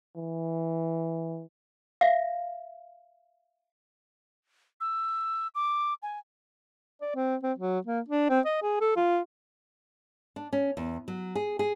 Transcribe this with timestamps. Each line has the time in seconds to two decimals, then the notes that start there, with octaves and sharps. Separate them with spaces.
0.16 E3
2.01 E5 F5
4.80 E6
5.55 D6
6.03 G#5
7.01 D5
7.15 C4
7.43 C4
7.58 F#3
7.86 A#3
8.08 D4
8.29 C4
8.45 D#5
8.62 G#4
8.81 A4
8.96 F4
10.36 D4
10.53 C#4
10.77 E2
11.08 F#3
11.35 G#4
11.59 G#4